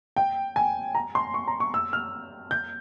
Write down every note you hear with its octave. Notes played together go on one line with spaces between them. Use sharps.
G5
G#5
A#5
C6
C#6
A#5
C#6
E6
F6
G6